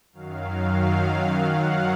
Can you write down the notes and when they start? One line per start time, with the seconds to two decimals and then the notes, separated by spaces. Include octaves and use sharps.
0.12 F#2 D#3 F#3 F5
1.33 F#5